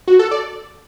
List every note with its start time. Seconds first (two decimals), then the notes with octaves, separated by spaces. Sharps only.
0.08 F#4
0.19 A4
0.31 D5